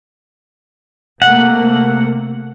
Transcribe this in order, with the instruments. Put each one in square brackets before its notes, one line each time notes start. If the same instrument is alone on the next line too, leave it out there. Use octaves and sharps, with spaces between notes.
[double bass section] C3 A3 A#3 [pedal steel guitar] F#5